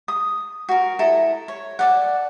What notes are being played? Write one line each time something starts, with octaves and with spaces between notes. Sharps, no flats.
D#6
F#4 A#4
E4 A4 A#5
C#5
A4 D5 F#5